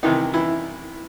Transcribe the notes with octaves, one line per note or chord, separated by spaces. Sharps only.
C2 C3 D#3 E3 D#4
E3 E4